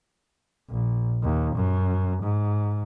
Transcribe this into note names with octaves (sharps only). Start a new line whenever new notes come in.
A#1
D#2
F#2
G#2